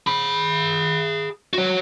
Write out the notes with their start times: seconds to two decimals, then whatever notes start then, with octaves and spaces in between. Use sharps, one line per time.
0.07 G#4 B5
1.53 F#4 C#5